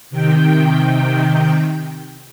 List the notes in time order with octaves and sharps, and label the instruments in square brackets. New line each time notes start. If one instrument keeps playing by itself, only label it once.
[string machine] C3 D#3 G5